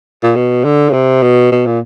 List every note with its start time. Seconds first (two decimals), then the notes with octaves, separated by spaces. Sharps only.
0.23 A#2
0.36 B2
0.64 D3
0.89 C#3
0.93 C3
1.22 B2
1.52 B2
1.66 A#2